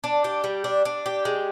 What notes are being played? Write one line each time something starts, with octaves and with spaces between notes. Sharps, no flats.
D4
G4
G3
D4
D4
G4
G#3